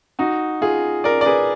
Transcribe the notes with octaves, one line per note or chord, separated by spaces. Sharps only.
D#4 F#4
F4 G#4
A#4 D5
D5
G#4 B4